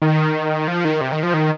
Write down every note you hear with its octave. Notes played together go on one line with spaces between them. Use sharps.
D#3
F3
D#3
C3
D#3
F3
D#3